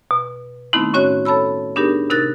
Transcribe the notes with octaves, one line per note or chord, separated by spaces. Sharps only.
B2
D#3 A3 B3 C4 D#4 E4
A2 C#4 F#4 C#5 D#5 F#6
A4 C#5 A5 B5 E6
B3 D4 D#4 G4 G#4 A#4
C3 D#4 A#4 F#6 A6